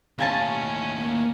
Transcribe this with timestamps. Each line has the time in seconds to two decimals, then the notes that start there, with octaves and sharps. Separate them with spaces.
0.18 D#2 A2 C#4 F4 G#5 A5
0.97 A#3